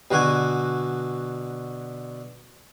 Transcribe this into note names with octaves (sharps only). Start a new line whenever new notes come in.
B2 D3 F#4 G#5